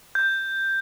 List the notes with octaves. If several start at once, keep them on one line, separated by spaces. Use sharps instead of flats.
G6